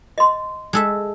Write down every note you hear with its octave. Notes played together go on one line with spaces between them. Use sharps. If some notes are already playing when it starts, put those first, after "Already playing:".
D#5 C6
G#3 A4 E5